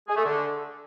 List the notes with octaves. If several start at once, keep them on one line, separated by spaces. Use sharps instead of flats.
G#4
A3
D3